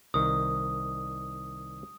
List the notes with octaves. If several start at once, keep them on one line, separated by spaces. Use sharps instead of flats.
C2 D#3 D#6